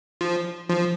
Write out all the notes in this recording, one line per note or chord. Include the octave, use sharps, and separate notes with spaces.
F3
F3